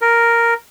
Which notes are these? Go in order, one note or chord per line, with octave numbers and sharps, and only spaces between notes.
A#4